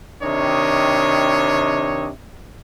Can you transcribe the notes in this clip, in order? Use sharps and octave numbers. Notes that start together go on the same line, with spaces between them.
C3 D#3 D4 C#5 D#5